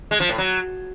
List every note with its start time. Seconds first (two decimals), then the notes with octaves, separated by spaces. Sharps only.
0.11 G#3
0.20 F3
0.29 A2
0.38 F#3